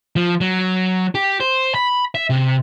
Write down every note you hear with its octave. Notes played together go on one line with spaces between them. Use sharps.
F3
F#3
G4
C5
B5
E5
C3